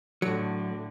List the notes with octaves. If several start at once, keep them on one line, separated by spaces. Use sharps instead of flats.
A2 D3 F#3